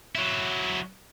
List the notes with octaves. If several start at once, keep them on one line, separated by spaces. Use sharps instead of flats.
F#3 E4